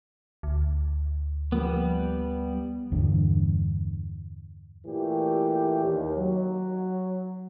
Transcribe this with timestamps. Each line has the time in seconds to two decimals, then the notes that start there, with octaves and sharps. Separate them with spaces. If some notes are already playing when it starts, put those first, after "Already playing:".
0.43 D2
1.52 F3 G3 A#3 B3
2.92 E2 G2 D3
4.85 A#2 E3 A3 G4
5.83 D#2
6.16 F#3